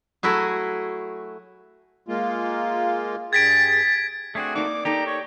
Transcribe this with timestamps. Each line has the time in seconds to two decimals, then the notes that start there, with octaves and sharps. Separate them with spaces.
0.23 F#3 A3 E4 F#4 G#4
2.08 G#3 A#3 F4
3.33 G2 G#4 G5 G#6 A6 B6 D7
4.35 A3 C4 D4 F#4 G#4
4.55 A#3 D#4 D5 D6
4.85 A#3 D#4 G4 A4 A#5
5.07 C#5 D5